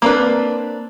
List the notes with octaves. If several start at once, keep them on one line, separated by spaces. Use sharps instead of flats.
A#3 C4 D4 B4